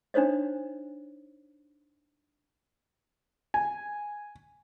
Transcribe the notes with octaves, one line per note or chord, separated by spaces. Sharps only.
D4 D#4 C5 C#5 D#5
G#5